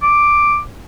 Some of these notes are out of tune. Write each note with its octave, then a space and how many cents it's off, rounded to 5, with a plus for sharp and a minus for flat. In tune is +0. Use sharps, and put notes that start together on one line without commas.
D6 +5